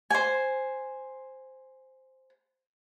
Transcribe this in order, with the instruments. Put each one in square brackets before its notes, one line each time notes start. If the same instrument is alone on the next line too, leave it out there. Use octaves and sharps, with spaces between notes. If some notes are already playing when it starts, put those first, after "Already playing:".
[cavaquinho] C5 G#5